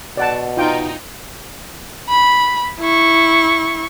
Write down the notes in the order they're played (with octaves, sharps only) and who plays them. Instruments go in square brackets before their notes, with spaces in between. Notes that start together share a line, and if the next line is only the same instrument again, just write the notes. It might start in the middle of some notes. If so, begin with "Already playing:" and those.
[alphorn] B2 [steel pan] D5 F#5 A5
[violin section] D#4 [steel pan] F4 G5
[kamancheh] B5
E4 C#6